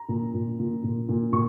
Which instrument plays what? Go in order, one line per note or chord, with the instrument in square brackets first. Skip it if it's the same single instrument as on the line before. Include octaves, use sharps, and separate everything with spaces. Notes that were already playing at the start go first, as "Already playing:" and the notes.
Already playing: [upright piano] A#5
A#2
A#2
A#2
A#2
A#2
A#2 C#6